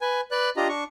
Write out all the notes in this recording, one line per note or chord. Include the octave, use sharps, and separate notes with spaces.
B4 G#5
B4 D5 F#6
D4 F4 G4 D#5 A#5
D4 C#6